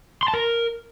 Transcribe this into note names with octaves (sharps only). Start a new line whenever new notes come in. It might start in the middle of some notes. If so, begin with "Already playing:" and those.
C6
A5
A#4